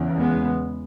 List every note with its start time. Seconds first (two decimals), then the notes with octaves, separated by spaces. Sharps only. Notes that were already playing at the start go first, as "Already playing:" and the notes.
Already playing: E2 C#3
0.18 G#3 B3